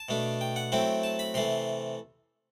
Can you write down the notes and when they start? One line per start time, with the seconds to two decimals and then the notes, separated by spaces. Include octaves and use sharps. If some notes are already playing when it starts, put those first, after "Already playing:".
Already playing: A5
0.09 B2 A3 D4
0.41 G5
0.56 F#5
0.72 F#3 A3 C4 E4 G5
1.03 A5
1.19 B5
1.34 C3 E3 A3 C6